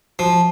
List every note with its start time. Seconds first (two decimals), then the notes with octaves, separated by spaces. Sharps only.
0.19 F3